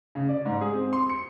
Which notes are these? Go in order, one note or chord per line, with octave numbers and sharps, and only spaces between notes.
C#3
D5
G#2
G#4
C4
C6
C#7